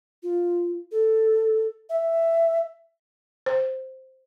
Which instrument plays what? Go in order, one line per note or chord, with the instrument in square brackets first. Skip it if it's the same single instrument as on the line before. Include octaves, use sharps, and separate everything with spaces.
[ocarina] F4
A4
E5
[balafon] C5